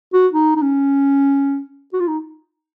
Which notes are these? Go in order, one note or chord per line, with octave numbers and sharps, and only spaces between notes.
F#4
D#4
D#4
C#4
F#4
F4
D#4